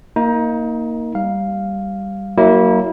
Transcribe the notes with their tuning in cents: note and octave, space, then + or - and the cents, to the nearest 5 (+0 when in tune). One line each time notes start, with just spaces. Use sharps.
A#3 +0 D#4 +25
G3 +5 F5 +0
F#3 +20 A#3 +0 E4 -25